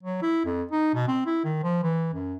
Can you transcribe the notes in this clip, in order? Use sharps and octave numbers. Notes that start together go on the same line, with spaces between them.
F#3
E4
F2
D#4
B2
C4
E4
D#3
F3
E3
F#2